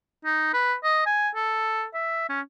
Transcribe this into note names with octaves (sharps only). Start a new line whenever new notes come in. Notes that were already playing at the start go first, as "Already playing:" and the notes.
D#4
B4
D#5
G#5
A4
E5
C#4